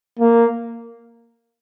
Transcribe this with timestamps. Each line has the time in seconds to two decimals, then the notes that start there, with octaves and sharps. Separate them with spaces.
0.19 A#3